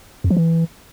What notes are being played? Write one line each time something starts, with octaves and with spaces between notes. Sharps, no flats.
F2
F3
E3